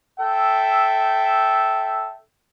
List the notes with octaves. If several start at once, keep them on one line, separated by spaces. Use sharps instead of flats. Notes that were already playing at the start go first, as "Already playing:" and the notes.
A4 E5 G5